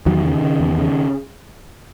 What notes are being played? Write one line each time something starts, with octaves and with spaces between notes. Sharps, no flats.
E2 D#3 F#3
C#3
C#3
E2
C#3